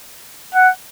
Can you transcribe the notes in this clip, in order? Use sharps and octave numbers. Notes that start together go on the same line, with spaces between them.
F#5